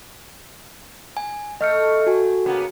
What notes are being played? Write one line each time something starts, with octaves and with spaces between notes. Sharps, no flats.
G#5
A3 D#5 F6 C#7
F#4 G#5
C#3 A#3 B3